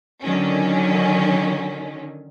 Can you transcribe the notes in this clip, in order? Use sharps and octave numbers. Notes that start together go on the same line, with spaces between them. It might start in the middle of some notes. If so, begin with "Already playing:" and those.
D3 D#3 F#3 C#4